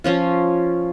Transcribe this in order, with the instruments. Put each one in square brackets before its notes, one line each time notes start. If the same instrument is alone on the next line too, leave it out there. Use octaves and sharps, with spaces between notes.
[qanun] F3 C#4 F4